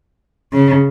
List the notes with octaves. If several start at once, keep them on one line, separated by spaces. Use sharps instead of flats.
C#3